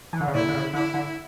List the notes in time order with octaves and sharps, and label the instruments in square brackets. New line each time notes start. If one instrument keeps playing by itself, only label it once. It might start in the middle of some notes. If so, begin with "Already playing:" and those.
[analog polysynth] E3
D3
C#3
[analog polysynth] A#2 [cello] E4
[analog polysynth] D3
C#3
[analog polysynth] D3 [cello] E4
[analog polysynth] D3